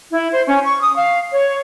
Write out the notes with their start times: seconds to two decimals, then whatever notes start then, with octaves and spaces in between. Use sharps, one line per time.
0.11 E4
0.32 C5
0.46 C#4
0.65 C#6
0.81 D#6
0.95 F5
1.32 C#5